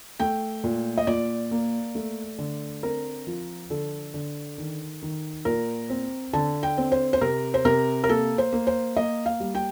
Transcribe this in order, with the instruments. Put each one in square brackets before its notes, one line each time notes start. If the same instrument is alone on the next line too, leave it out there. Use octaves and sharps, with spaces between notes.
[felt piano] A3 G5
A#2
D#5
A#2 D5
A#3
A3
D3
C4 A#4
F3
D3 A4
D3
D#3
D#3
A#2 A#4
C4
D3 A5
G5
C4
C5
C5
C3 A#4
C5
C3 A#4
A#4
A#3 A4
C5
A#3
C5
A#3 D#5
F5
G3
G5